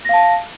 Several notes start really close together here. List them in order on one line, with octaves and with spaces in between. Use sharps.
A#6 F5 A5